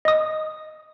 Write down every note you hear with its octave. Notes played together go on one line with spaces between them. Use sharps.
D#5 D#6